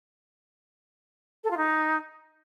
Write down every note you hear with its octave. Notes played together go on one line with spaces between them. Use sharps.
A4
F4
D#4